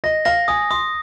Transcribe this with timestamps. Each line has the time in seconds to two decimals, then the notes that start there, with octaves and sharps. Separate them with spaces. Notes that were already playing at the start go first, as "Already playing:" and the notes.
0.04 D#5 A#6
0.25 F5 A#6
0.48 G#5 D#6
0.71 C6 D#6